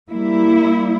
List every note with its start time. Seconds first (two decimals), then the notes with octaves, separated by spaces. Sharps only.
0.11 G3 A#3 E4